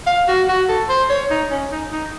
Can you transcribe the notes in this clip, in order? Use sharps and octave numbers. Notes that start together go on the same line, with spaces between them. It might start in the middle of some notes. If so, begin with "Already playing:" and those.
F5
F#4
F#4
A4
C5
C#5
D#4
C#4
D#4
D#4